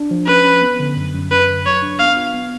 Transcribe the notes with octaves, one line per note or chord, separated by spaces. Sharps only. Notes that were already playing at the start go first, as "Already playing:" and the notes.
Already playing: D4
F3
C#4 B4
C#4
B3
D3
F#2
F#2
F#2 B4
D3
F#3 C#5
D4
B3 F5
F4
B3